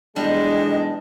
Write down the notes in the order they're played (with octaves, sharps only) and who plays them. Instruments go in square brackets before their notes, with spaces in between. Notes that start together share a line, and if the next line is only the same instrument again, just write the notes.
[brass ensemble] B1 E2 G#3 [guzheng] G3 [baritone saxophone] D4 [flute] D#5